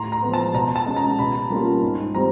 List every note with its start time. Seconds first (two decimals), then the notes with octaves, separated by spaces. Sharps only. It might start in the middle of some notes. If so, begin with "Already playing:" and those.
Already playing: A2 A#5 C6
0.12 A#5
0.22 F3 G#3 B3
0.33 A5
0.54 B2 A#5
0.76 A5
0.86 G#3 C#4
0.96 A#5
1.18 B2 B5
1.50 G3 A#3 C#4 F4
1.82 G#2
2.14 G3 C4 A#5